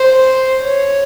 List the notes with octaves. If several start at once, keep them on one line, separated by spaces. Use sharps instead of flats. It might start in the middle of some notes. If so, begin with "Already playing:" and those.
Already playing: C5
C#5